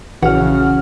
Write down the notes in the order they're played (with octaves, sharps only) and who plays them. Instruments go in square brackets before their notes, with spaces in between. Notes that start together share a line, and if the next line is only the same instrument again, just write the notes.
[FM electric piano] A#1 F#4 F6 [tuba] C#3 [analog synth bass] E3 [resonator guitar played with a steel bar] F#5